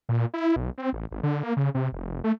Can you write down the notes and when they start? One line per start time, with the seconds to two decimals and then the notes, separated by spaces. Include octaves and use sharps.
0.09 A#2
0.34 E4
0.56 B1
0.78 C4
0.93 A1
1.11 G#1
1.23 D3
1.43 A#3
1.57 C#3
1.75 C3
1.92 F1
2.24 A3